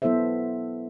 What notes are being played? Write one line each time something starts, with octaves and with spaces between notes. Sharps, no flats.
F#3 B3 E4 A4 C5 E5